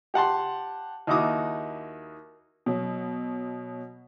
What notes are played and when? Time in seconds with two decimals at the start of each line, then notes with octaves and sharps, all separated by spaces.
0.14 G4 F#5 A5 C6
1.07 D#2 D#4 E4 F#4 D6 D#6
2.66 B2 F#3